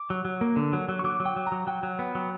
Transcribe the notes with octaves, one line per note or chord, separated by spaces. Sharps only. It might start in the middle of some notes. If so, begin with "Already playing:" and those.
Already playing: D6
F#3
F#3
A#3
D3
F#3
F#3
C#6
F#3 D6
F#3
G5
F#3
A#5
F#3
F#3 G5
F#3
B3
F#3